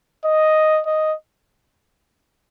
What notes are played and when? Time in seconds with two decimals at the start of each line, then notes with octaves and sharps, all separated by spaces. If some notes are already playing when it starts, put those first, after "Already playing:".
0.25 D#5
0.86 D#5